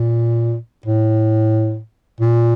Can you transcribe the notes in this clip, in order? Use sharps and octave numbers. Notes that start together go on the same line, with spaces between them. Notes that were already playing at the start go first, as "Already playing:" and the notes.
Already playing: A#2
A2
A#2